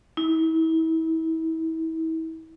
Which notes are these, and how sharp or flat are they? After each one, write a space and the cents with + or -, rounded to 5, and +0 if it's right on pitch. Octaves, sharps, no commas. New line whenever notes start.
E4 -35